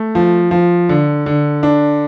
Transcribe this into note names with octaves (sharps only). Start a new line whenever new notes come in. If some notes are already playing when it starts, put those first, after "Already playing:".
Already playing: A3
F3
F3
D3
D3
D4